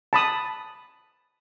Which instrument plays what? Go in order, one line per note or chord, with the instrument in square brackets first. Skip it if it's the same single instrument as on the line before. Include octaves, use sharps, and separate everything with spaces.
[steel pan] A5 B5 D#6